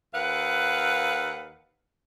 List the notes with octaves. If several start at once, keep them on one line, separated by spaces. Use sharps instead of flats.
D#2 B4 F5 F#5